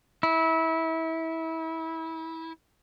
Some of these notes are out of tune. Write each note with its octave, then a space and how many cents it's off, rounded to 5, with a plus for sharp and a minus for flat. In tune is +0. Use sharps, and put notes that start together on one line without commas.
E4 -25